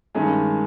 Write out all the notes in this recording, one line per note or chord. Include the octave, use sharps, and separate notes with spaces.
G2 D#3 G#3 C#4